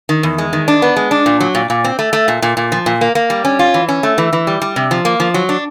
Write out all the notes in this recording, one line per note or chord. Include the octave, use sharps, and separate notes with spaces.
D#3
E2
G#3
D#3
D4
B3
G#3
D4
A#2
F#3
A#2
A#2
C4
A3
A3
A#2
A#2
A#2
F3
A#2
A#3
A#3
G3
C#4
F4
E3
C#4
A3
E3
E3
G3
G3
C3
F3
A#3
F3
F#3
D4